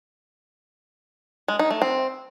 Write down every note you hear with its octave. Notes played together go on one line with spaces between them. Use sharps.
G#3
D#4
A3
C4